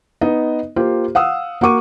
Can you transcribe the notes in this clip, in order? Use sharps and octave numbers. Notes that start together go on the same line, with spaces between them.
B3 D#4 D#5
A#3 F4 G4 C5
F5 F#5 D#6 E6
A#3 F#4 F#5 C#6 D6 D#7